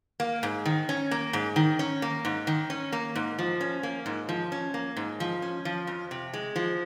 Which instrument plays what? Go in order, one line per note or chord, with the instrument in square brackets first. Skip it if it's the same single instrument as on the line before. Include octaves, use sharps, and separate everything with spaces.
[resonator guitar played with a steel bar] A#3
G#2
D#3
C#4
A#3
G#2
D#3
C#4
A#3
G#2
D#3
C#4
A#3
G#2
F3
C#4
A#3
G#2
F3
C#4
A#3
G#2
F3
C#4
F3
F2
C3
G#3
F3